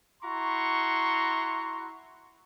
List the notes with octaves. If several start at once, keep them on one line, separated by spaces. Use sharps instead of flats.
E4 F#4 A#5 C6 C#6